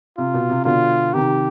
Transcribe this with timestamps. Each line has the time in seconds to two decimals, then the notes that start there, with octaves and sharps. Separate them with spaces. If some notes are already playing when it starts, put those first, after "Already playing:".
0.18 C3 F4
0.34 B2
0.50 C3
0.65 B2 D3 F4
1.13 C3 D#3 G4